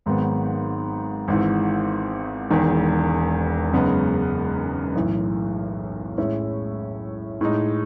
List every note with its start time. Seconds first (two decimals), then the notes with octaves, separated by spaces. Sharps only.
0.06 G#1 G#2 D#3 F#3 B3
1.28 G#1 G#2 E3
2.51 E1 E2 D#3
3.73 F#2 C#3 G#3 B3 D#4
4.95 B1 A2 E3
6.18 A2 G#3 C#4 E4
7.41 A2 G#3 D#4